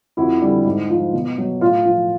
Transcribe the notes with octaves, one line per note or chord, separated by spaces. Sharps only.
F2 E4 F#4
D3 G3
G#2
F3
B2
F#3
A2 F4
F3